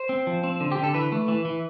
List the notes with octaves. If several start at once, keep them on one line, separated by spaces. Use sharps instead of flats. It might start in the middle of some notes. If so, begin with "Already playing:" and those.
Already playing: C5
C4
F3
C4
D3
G4
D3
A4
E3 B4
A3
E3
E3